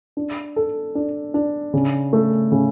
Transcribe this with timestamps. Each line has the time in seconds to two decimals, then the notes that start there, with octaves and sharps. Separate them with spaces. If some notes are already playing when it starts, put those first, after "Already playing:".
0.17 D4
0.56 A4
0.95 D4
1.34 D4
1.73 C#3
2.13 A3
2.52 C#3